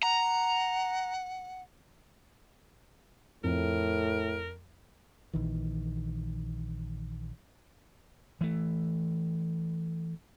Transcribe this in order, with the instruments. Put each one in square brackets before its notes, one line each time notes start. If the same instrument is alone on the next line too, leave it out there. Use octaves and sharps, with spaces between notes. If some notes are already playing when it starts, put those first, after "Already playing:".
[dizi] F#5 [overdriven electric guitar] A#5
[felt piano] F2 [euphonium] A2 [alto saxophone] A#4
[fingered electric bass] A#1 D#3 E3
[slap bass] E3 A3